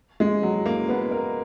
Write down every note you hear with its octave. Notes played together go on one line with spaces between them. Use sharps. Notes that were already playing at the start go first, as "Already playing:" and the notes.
G#3
F#3
A#3
B3
A#4